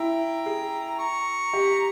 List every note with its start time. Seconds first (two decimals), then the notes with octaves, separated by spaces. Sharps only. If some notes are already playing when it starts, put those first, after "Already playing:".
Already playing: E4 G5 A#5
0.46 G#4
0.99 A#5 C#6
1.53 G4